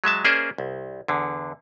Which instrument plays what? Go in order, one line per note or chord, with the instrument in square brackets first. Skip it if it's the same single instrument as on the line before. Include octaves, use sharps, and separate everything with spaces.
[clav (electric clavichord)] F#3 G#3 E5 A5
A#3 C#4 G#4 C5 D5 E5
C2
E2 D3